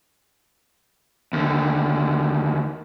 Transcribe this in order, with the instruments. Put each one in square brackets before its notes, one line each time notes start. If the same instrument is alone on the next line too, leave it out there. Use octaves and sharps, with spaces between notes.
[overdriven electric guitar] D#2 D3